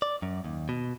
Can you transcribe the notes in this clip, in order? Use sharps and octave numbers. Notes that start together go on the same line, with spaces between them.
D5
F#2
D#2
B2